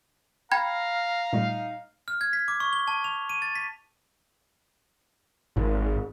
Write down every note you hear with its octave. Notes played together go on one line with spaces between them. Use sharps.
F5 G5 A#5 B5 G#6
A#2 G3 A3 D#4
F6
G#6
B6
D6
C#6
G7
A5
F7
D#7
A6
B6
G#1